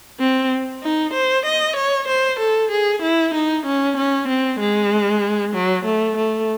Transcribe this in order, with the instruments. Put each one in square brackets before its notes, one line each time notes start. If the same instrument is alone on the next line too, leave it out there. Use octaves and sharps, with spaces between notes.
[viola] C4
D#4
C5
D#5
C#5
C5
A4
G#4
E4
D#4
C#4
C#4
C4
G#3
F#3
A3
A3